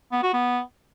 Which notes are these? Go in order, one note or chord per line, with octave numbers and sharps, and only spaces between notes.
B3
F#4
B3